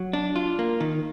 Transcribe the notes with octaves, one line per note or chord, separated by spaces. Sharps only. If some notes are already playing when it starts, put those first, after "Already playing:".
Already playing: F#3
D4
F4
A#3
D#3